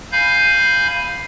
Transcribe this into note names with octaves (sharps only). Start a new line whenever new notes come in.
F5 G#5 B5 G6